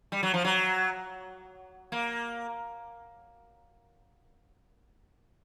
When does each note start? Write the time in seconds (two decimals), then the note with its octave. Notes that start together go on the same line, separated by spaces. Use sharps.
0.12 G3
0.23 F#3
0.34 F3
0.44 F#3
1.92 A#3